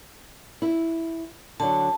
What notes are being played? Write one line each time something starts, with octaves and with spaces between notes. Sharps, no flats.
E4
D3 F#3 A5